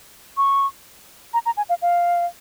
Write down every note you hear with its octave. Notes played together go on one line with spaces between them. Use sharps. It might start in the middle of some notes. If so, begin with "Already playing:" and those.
C#6
A#5
A#5
G#5
F5
F5